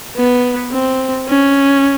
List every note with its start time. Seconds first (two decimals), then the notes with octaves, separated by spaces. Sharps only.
0.17 B3
0.72 C4
1.28 C#4